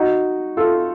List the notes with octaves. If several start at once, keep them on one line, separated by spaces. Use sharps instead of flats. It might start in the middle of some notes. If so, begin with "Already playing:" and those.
Already playing: D#4 F#4
F4 A4